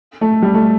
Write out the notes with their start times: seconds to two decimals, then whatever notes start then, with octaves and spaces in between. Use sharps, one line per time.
0.21 A3
0.42 G3
0.55 A3